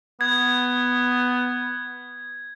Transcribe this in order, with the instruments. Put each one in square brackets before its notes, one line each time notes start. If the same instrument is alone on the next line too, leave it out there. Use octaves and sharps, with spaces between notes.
[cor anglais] B3 [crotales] G#6